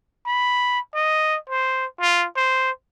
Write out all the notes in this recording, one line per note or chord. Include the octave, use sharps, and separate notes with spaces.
B5
D#5
C5
F4
C5